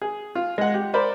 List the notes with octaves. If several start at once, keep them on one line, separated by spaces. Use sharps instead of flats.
G#4
F4
G#3 F#5
G4
A#4 C5 D5 B5